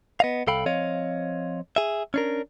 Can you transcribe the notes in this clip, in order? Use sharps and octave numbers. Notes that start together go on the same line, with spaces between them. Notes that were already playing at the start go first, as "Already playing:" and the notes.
B3 D#5 F5
C2 A4 F5 G5 B5
F3 C4 C#5 D#5 F5
G#4 E5
C#4 D4 A#4